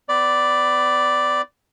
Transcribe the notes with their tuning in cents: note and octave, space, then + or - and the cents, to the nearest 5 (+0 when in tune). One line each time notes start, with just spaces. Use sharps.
B3 +40 D5 +0 B5 +15